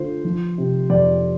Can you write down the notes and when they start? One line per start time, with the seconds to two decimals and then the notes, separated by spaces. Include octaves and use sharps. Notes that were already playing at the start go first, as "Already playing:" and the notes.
Already playing: D3 A3 F4 C5
0.25 F3
0.58 C3
0.90 F2 D5